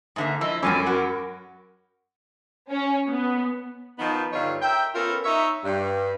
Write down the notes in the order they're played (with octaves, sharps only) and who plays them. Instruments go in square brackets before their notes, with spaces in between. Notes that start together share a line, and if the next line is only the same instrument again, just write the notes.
[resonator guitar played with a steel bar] G#2 D3 A#3 [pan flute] E5
[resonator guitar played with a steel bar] F3 [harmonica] E4 B5 E6 [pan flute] D#5
[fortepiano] F#2 C#4 [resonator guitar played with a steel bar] F3 C4 A4 [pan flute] G#5 [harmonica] B5 D6
[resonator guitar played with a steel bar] F#4 [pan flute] A#4
[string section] C#4
B3
[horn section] D#3 F3 B3 D#4
G2 D3 D#4 F4 C#5
A#4 E5 G5
B3 C#4 F4 A4 A#4
D#4 C#5 E5
G2